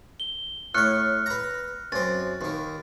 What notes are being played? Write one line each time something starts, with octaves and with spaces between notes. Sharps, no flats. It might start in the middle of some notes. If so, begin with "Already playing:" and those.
G7
A2 C#5 F6 F#6 C#7
B4 A#5
F#2 C4 A6
D#2 D#3